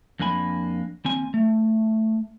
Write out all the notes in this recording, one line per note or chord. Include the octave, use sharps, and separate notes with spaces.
F2 A#3 D4 G#5 B5
D#2 C4 G#5
A3